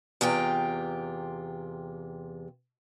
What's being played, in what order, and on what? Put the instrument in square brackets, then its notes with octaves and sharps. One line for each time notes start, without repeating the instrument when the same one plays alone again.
[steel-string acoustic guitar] E2 C3 F4 G5